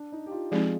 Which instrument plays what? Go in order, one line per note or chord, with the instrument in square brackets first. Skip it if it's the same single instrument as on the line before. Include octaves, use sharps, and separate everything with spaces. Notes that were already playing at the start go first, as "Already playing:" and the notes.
Already playing: [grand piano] D4
D#4
G4
F4
[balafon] F3 G#3 C4 D#4 [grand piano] G#4